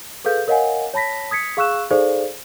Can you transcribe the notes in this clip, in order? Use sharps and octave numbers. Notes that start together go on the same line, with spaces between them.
G#4 A4 B4 F5 G6
A#4 C#5 D#5 F5 F#5 G#5
C#5 A5 B5 A#6 B6
D#6 G#6 B6 C#7
G#4 F5 C#6 E6 F#6 E7
D#4 G#4 A4 C5 D5 F5